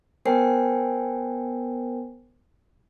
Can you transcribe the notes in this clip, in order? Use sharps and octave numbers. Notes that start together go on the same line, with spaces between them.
B3 A#4 C5 G5 G#5 C7